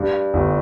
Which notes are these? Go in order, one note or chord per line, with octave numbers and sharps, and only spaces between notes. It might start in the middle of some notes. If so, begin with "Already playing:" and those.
Already playing: G2
G1